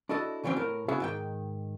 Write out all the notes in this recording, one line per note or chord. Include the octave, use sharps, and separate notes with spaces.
D4 E4 F#4 A4 D#5
C#3 E3 F#3 G3 C4 C#4
A2 A#4
B3 C#4 E4 F#4 G#4 E5
G#2 D#3 G5